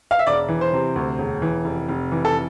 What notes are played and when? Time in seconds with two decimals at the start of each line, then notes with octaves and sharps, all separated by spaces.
0.11 F5
0.19 E5
0.26 E1 D5
0.48 E3
0.61 C5
0.73 C3
0.96 D2
1.18 E1
1.42 E3
1.65 F1
1.89 F1
2.12 E3
2.25 A4